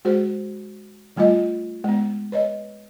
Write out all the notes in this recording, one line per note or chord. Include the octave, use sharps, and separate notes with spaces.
G#3 F#4 G#4 C5
D#3 G3 A3 F4 D#5
G#3 B3
B4 C#5 D#5